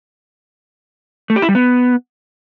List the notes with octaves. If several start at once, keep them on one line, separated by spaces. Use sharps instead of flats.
A3
G4
E4
G3
B3